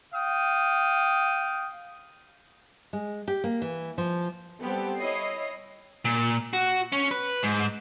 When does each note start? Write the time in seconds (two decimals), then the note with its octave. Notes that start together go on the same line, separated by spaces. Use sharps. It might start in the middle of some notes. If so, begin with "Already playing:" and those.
0.13 F5 G5 D#6
2.93 G#3
3.28 G4
3.44 A#3
3.62 E3
3.98 F3
4.60 G3 B3 C4 G4 A4
5.01 E4 C#5 D#5 C7
6.05 A#2
6.53 F#4
6.92 C#4
7.11 B4
7.43 G#2